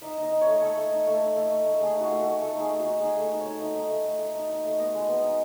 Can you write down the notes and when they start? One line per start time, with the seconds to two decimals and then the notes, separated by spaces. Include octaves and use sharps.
0.01 D#4 E5
0.18 D#4 D#5
0.32 D#4
0.41 C#5
0.47 A3
0.61 A3 A4
0.77 A3
0.91 D#4
1.07 A3
1.21 D#4
1.36 A3
1.51 A3
1.65 A3
1.81 A3 G#4
1.96 D#4 F#4
2.11 A3
2.20 F#4
2.26 A3
2.40 A3 A4
2.55 D#4 G#4
2.70 A3
2.80 D#4 F#4
3.00 D#4 G#4
3.16 A3 A4
3.29 D#4
3.40 D#4 C#5
3.59 D#4 E5
3.75 D#4
3.89 A3
4.04 A3
4.19 A3
4.34 D#4
4.49 D#4
4.64 A3
4.79 B3 D#5
4.94 G#3
5.08 B3
5.24 D#4